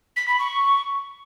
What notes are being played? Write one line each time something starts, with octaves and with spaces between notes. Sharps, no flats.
B6
B5
C#6